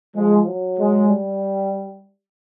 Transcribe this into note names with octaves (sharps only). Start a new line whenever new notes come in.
F3 G#3
F#3
G#3
G3